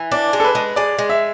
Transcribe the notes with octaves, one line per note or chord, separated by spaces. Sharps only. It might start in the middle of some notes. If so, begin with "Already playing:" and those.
Already playing: E3
D4 D5
G#3
A4
B4
G#3
G#3 D5
G#3
E5